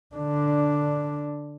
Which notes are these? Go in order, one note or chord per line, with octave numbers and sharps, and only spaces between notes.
D3 D4